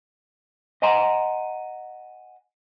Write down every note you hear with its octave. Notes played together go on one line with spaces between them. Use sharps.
D#5 F#5 G#5 A#5 C6